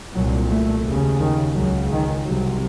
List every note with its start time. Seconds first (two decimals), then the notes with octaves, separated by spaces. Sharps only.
0.15 C2 A#2 F#3
0.50 A3
0.85 D#2 C#3
1.20 D#3
1.55 C#2 C#3 F#3
1.91 D#3
2.25 C2 C3 F#3